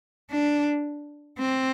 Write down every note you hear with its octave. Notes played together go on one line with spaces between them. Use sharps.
D4
C4